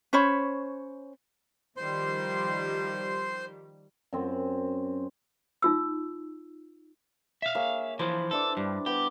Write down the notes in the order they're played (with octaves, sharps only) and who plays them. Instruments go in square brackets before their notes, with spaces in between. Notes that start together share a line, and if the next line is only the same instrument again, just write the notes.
[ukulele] C#4 C5 C#5 B5
[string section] D#3 F3 G3 [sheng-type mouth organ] C5 C6
[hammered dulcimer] F#2 C4
[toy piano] D#4 F4 E6
[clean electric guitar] E5 F5
[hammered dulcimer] A#3 G#4 C#5
[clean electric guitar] E3 F3 [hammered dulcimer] C5 A5 C#6
[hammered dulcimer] E3 D4 D6 [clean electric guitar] A4
[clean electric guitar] G2 [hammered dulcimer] G3
[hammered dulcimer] B3 [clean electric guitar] G4